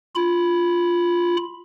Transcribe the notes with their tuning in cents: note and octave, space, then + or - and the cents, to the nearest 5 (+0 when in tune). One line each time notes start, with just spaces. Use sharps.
F4 +0 B5 +0